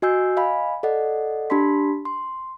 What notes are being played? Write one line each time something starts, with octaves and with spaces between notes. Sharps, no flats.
F#4 D#5 G#5 E6 G6 C7
D#5 F5 G#5 B5
A4 D5 D#5 F#5
D4 G4 A5 B5 C6 B6
C6